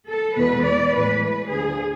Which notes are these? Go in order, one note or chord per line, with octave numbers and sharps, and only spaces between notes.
A4
E2 B2 G#3 B4
D5
A2 E3 G#3 B4
B4
D2 D3 F3 G#4